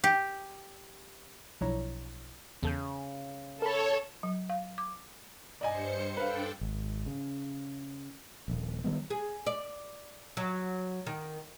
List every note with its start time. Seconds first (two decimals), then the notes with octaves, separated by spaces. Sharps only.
0.04 G4
1.61 B1 F3 D4 E4 C#5 A#5
2.63 E2 C#3 A4 G6
3.62 A4 A#4 C#5 B5
4.23 F#3
4.49 F5
4.78 D6
5.61 G2 C5 D5 D#5 G#5 C#7
6.17 D4 A4 B4 F5 G5
6.61 G#1
7.06 C#3
8.48 D#1 A#1
8.84 D#3 G3 B3
9.10 G#4
9.46 D5
10.37 F#3
11.06 D#3